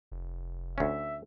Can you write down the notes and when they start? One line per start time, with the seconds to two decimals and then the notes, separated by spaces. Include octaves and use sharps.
0.12 F1
0.78 D2 C#4 E5